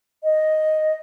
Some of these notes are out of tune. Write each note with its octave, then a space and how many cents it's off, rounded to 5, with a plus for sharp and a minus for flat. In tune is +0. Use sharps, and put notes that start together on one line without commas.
D#5 +0